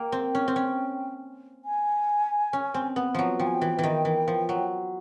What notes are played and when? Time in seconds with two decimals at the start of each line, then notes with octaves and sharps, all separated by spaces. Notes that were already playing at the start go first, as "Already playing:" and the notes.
Already playing: A#3 G5
0.12 C4
0.35 C#4
0.48 C4
0.56 C#4
1.65 G#5
2.53 C#4
2.74 C4
2.96 B3
3.15 F3 F#3
3.40 F3 G5
3.46 G#5
3.54 G5
3.61 E3
3.79 D#3 E3
4.05 E3
4.28 F3
4.49 F#3